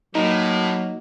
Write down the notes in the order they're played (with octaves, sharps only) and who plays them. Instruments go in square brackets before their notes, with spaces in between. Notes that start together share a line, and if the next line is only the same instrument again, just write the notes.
[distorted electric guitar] A2 [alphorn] F#3 [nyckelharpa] A#3 [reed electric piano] D#4 D#5